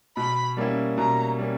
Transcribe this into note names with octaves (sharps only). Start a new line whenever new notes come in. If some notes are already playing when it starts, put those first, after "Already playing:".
B2 B5
G3 A#3 C#4 E4
B2 A#5
G3 A#3 C#4